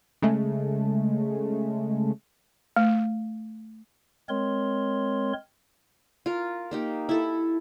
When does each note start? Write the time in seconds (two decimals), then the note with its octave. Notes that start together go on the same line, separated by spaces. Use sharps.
0.22 C#3 G#3 A3
2.76 A3
4.29 G#3 C4 A#4 C#5 C6
6.26 F4 A#4
6.71 A#3 D#4 G4
7.09 E4 A4